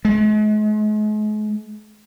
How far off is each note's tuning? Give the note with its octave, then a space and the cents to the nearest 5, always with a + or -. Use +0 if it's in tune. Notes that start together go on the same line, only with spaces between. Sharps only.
G#3 +40